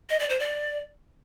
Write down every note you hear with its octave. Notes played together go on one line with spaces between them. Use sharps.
D#5
D5
C5
D5